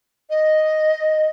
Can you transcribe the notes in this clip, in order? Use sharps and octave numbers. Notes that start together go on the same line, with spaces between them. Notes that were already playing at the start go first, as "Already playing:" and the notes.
D#5